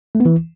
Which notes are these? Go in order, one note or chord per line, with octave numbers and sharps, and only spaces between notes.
A3
B3
E3